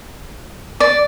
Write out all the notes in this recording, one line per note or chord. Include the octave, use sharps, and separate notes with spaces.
D5